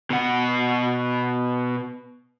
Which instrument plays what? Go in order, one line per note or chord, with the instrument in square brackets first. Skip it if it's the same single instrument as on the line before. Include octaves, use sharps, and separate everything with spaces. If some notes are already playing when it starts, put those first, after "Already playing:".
[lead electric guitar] B2 F#5